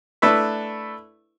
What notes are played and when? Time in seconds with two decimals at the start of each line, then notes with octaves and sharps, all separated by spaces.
0.22 A3 D4 E4 B4 E5